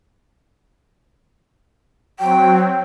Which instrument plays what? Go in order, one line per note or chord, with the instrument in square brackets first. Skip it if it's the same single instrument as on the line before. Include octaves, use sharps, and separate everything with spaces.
[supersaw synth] F#3 C4 [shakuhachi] G5